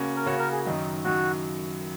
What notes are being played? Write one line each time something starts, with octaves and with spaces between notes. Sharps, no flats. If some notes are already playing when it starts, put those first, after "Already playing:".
Already playing: C#3 A#3 C#4 F#4
A#4
C#3 A#3 C#4 F#4 C#5
A#4
G#4
F#2 D#3 F#3 D#4
F#2 D#3 F#3 F#4